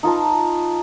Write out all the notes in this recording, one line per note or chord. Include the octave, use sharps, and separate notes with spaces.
D#4 F4 B4 A5